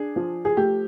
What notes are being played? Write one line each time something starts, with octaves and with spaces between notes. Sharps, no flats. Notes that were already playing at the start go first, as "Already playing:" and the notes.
Already playing: D4 G#4
F3
G#4
A3 G4